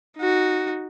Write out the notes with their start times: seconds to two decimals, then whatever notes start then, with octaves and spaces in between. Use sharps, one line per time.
0.18 D#4 F#4